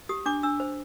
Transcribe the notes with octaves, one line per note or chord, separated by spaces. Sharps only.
G4 D#6
D4 D6
D4 E6
C5